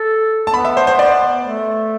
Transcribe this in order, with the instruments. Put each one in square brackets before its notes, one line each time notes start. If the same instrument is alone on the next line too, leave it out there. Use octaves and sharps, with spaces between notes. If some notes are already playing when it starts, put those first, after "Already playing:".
Already playing: [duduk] A4
[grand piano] A5
[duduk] B3 [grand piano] B5
[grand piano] E5
C5
C5
D5
[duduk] A3